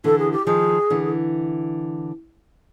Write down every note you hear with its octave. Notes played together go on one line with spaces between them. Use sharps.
D3 E3 A4
G#4
G4
D#3 F3 G#4
D3 E3